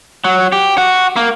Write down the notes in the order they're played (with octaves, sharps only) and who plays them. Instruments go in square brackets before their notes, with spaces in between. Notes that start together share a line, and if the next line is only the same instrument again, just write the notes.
[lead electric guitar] F#3
G4
F#4
A#3